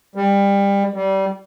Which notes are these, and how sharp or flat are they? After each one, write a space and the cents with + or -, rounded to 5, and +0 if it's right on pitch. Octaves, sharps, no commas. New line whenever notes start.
G3 +25
G3 -25